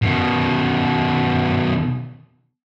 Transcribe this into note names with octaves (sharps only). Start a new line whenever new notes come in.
B2 D#3